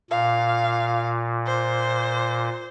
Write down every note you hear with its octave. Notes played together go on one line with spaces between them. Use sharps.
A#2 F5
C5